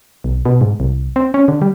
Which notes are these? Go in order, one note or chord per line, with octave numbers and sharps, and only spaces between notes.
B1
B2
G#2
C2
C4
C#4
D3
G3